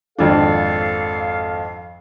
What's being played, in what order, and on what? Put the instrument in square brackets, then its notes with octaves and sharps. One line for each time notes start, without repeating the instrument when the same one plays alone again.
[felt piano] G#1 F2 D4 [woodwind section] A4 F5